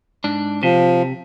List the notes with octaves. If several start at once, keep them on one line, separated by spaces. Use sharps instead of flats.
G#2 D4
C3 F3